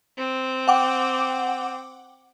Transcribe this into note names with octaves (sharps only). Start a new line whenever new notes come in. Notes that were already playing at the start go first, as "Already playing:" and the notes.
C4
F#5 G5 D6